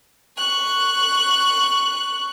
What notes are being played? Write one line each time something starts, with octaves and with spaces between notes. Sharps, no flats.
C#6 F#6